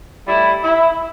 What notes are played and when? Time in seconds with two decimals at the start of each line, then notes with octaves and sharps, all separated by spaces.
0.26 A2 G3 E4
0.63 E4